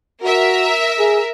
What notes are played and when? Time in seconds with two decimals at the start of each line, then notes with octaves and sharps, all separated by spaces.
0.23 F#4 A#4 E5
0.99 G#4